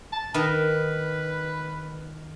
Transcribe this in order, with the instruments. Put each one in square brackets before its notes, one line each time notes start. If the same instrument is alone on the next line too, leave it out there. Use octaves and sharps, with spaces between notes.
[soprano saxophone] A5
[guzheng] D#3 [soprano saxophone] B4